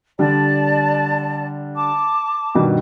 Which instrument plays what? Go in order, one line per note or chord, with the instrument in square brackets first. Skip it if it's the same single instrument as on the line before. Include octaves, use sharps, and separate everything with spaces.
[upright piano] D3 G3 [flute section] D5 A5
[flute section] A5 D6
[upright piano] G2 B2 D#3